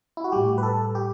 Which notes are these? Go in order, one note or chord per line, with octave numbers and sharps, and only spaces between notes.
E4
F#4
A2 G3 G4
B4
A4
G4